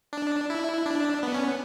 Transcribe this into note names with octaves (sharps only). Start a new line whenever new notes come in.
D4
E4
D4
B3
C#4
B3